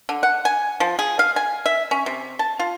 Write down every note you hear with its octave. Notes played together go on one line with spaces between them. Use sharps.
D3
F#5
G#5
F3
G#4
F5
G#5
E5
C#4
C3
A5
F4